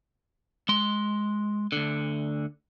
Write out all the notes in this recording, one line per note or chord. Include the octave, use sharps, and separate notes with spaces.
G#3 C6
D2 D3